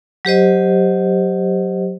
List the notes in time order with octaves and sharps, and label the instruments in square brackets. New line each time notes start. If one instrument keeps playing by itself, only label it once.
[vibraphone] F#3 G4 C5 D#5